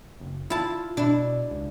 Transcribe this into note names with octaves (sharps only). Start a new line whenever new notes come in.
F#1
E4 F4 A5
B2 D4 E4
C#2